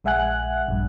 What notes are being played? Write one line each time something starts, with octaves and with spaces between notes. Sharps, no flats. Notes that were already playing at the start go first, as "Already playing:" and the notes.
A#1 G#3 E5 F#5 G#5 F#6
A#1 G2